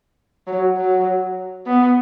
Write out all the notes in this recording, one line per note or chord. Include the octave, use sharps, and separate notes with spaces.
F#3
F#3
B3